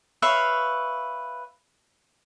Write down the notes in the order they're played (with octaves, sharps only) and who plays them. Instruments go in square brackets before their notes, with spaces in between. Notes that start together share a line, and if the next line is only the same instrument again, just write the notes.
[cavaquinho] B4 C#5 E5 F5